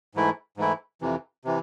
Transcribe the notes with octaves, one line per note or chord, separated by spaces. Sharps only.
G#2 E3 A3 E4
G#2 E3 A3 E4
F2 C3 E3
C3 E3